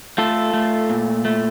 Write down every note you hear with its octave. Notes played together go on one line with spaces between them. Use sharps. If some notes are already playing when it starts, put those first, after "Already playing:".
A3 F4 A4
A3
A#2
A3